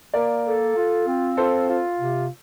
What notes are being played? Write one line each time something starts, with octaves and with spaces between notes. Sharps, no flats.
A#3 A#4 D5
A4
F4
C4
F4 A4 C5
F4
C3